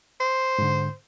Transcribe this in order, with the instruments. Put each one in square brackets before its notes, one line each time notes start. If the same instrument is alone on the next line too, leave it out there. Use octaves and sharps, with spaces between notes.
[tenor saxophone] C5
[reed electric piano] G#2 D3